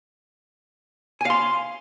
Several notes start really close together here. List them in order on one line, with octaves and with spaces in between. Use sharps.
G#5 F5 C6